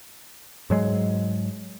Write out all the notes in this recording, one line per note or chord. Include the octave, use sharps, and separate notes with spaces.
G#2 F#3 G#3